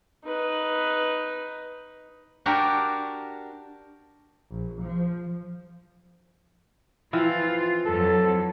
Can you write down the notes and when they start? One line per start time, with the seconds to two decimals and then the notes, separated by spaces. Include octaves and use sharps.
0.25 D#4 B4
2.46 D4 F#4 G4 A#4 A#5
4.51 A#1
4.82 F3
7.13 E3 F3 C4 F4
7.86 F2 F#3 A4